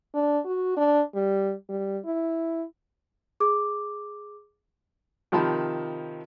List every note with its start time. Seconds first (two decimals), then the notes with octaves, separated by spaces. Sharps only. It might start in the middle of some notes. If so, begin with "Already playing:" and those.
0.14 D4
0.45 F#4
0.77 D4
1.15 G3
1.69 G3
2.05 E4
3.40 G#4 D6
5.32 C3 D#3 F3 A5 B5